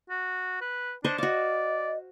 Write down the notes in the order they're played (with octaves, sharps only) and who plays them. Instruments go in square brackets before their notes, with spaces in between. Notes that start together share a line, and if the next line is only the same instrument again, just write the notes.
[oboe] F#4
B4
[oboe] D4 [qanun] C5 D#5 C#6
[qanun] F#4 F5 [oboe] D5 [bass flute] D#5